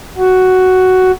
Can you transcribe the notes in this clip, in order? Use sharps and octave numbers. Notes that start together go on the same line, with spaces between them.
F#4